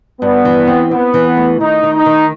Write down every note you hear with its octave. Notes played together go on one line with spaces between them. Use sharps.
G2 B3
E3
C4
B3 C4
E3
A3
D#3 D#4
D#3
D#4
D#3